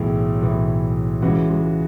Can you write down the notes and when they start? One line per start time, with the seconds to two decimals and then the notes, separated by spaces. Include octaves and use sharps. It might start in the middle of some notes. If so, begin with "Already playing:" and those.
Already playing: B1 A2 E3 G#4
0.42 B1 A2 E3
1.22 C#2 C#3 E3 F#4
1.50 G#3